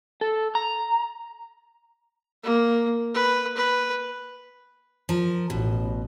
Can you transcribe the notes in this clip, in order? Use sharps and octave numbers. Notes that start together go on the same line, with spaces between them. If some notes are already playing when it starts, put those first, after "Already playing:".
A4
A#5
A#3
B4
B4
F3 A#4
A1 B2